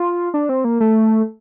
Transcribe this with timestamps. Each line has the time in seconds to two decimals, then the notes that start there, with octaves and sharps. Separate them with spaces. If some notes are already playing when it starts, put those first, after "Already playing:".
Already playing: F4
0.34 D4
0.49 C4
0.64 A#3
0.80 A3